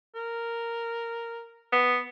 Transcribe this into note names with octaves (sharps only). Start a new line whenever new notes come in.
A#4
B3